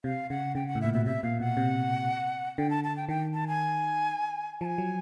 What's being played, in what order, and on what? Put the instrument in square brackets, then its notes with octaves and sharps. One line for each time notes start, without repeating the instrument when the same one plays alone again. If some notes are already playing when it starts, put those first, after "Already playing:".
[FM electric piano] C3 [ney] F5
[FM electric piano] C#3 [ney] F#5
[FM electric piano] C#3 [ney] G5
[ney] F#5
[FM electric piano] A2
[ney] E5
[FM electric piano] A#2
[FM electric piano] B2 [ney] E5
[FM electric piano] C3 [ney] E5
[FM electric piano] A#2 [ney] F5
[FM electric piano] B2 [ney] F#5
[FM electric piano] C3
[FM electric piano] D3 [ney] G5
[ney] A5
A5
G5
[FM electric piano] D#3 [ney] G5
[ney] A5
G#5
[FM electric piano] F3 [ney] A5
[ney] G#5
[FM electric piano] F#3